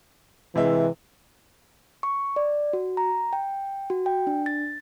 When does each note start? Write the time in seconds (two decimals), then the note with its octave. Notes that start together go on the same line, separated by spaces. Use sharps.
0.55 C3 E3 G#3 E5
2.03 C#6
2.36 D5
2.73 F#4
2.97 A#5
3.33 G5
3.90 F#4
4.06 G5
4.27 D4
4.46 A6